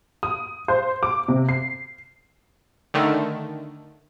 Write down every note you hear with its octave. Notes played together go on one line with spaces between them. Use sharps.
D#6
C5
D6
C3
C7
D3 D#3 A3